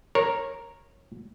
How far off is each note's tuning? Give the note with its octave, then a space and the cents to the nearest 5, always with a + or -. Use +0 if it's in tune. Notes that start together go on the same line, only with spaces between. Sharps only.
A#4 +0 C#5 -20